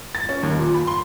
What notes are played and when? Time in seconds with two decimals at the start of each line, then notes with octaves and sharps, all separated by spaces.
0.15 A6
0.29 C#4
0.43 D#2
0.58 A#2
0.74 B5
0.87 C6